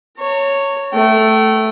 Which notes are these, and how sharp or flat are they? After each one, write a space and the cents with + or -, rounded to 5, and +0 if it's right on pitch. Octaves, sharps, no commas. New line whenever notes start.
C#5 +0 A#5 -45
A3 +0 G5 -35